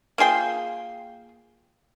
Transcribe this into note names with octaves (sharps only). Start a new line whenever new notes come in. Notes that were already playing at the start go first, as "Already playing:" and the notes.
A#3 F4 G#4 G5